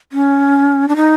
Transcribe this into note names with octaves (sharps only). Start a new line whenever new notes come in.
C#4
D4
D#4